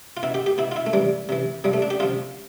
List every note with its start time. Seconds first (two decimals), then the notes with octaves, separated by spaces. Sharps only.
0.17 F4
0.23 B2 E4
0.34 G4
0.46 G4
0.58 B2 E4
0.72 F4
0.76 E4
0.86 A3
0.93 C3 E3 G3
1.29 C3 E3
1.64 C3 F3 G3
1.73 A3
1.82 D4
1.90 G4
2.00 C3 F3 F4